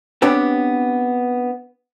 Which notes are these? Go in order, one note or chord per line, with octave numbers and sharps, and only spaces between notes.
B3 C4 D4 G4 B4 C#5